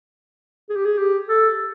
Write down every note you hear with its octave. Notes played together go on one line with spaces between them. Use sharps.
G#4
G4
G#4
G4
A4